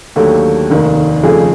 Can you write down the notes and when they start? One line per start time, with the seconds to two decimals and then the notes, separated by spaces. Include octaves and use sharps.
0.16 D#2 D3 F#3 A3 G4
0.70 F1 D#2 D#3
1.24 F2 C#3 F3 A3 G#4